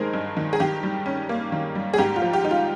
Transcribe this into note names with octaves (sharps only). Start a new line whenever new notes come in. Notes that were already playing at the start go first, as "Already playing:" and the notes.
Already playing: G2 D#3 G#3 D#4 G#4 A#4 C5
G2
D#3
G#4
D#3 G4
G3
C#4
A#3
D#3
G3
G#4
G#2 G4
F4
F3
G4
D#4
F4